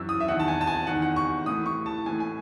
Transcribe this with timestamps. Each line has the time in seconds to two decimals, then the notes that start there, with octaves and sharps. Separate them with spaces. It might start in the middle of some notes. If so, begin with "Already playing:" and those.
Already playing: F#2 E3 E6
0.09 D#6
0.20 E5
0.28 E2 D#3 F#5
0.40 A5
0.48 G#5
0.61 A5
0.67 G#5
0.87 E2 D#3 F#5
1.02 F#5
1.16 C#6
1.46 A2 E3 D#6
1.66 C#6
1.86 A5
2.06 A2 E3 G#5
2.20 G#5